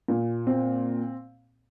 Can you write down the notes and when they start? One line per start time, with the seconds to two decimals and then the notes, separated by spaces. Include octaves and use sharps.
0.08 A#2
0.47 C4